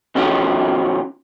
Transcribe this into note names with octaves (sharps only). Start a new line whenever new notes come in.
B2 D#3 F3 C#4 F#4